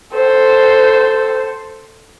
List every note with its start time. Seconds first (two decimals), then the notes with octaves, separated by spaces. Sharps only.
0.13 A4 C5